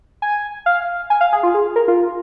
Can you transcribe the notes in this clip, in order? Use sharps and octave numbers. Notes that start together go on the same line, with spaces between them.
G#5
F5
G#5
F5
G#4
F4
G#4
A#4
F4